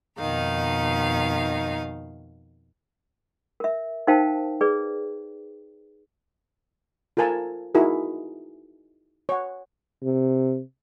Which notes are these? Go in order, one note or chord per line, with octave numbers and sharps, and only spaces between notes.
F2 B2 D#3 D#4 F5
A#4 E5
D#4 A#4 C5 F5 G5 A5
G#4 B4 D5
F4 A4 A#4 G#5 A5
D#4 E4 F#4 G#4 A#4
C#5 F#5
C3